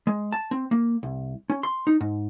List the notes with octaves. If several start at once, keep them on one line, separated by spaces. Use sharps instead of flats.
G#3
A5
C4
A#3
C2
C#4
C6
D#4
G#2